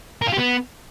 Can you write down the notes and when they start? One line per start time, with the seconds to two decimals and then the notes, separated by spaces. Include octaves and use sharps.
0.22 A#4
0.27 F4
0.32 G4
0.38 B3